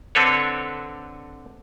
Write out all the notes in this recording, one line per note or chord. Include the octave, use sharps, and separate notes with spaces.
D3 C4 D4 A4 B4 C#5